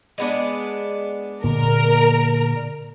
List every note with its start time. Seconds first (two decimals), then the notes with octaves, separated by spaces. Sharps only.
0.18 G#3 B3 D4
1.44 A#2 D3 A#3 A#4